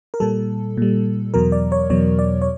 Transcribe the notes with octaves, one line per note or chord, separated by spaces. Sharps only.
A#4
A#2 G3 A4
A#2 G3
E2 B2 F#3 A#4
D5
C#5
E2 B2 F#3 C#5
D5
C#5